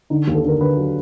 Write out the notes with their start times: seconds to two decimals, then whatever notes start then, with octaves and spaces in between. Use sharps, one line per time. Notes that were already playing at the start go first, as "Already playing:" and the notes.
0.10 D3 D#4
0.27 D#2
0.35 A4
0.44 D3 A#4
0.61 D3 B4
0.77 F#3